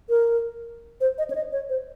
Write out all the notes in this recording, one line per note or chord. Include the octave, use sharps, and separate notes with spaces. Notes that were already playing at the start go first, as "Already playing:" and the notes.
A#4
C5
D#5
C#5
D#5
C#5
C5